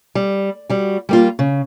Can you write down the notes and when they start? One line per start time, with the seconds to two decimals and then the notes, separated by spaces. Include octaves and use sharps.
0.15 G3
0.69 G3 F#4
1.09 G3 A#3 F4
1.39 C#3